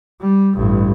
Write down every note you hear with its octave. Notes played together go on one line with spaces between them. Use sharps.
G3
A1 G2